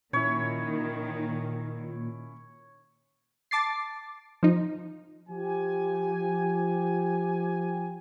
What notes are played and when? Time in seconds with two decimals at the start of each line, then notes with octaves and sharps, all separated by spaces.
0.13 A#2 D#3 C#4 E4 C#5
3.51 A5 D6 A6 C7
4.43 F3 D#4
5.30 F3 G4 G#5